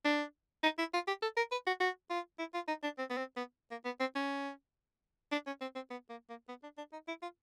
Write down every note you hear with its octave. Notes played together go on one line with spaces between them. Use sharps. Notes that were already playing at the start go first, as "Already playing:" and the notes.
D4
D#4
E4
F4
G4
A4
A#4
B4
F#4
F#4
F4
E4
F4
D#4
D4
C4
B3
C4
B3
A#3
B3
C4
C#4
D4
C#4
C4
C4
B3
A#3
A#3
B3
D4
D4
D#4
E4
F4